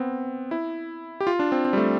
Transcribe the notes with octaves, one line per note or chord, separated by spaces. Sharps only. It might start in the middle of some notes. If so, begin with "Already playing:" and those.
Already playing: B3 C4
E4
G4
F4
D4
C4
C4
G3
A3